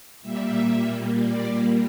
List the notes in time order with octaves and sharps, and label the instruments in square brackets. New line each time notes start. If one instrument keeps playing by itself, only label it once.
[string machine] A#2 G3 A#3 E5
D5